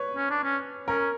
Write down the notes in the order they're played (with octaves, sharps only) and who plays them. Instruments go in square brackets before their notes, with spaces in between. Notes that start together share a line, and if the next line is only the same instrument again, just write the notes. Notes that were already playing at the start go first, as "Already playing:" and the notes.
Already playing: [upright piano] B4 C#5
[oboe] C#4
D4
C#4
[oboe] C#4 [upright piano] A#4